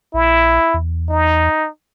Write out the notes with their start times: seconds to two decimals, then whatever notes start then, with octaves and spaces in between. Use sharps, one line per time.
0.14 A#1 E4
0.74 E2
1.09 D#4